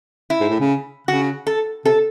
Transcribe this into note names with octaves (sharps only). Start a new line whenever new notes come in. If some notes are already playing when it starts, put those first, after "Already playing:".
E4
G#2
A2
C#3
C#3 F#4
A4
C3 A4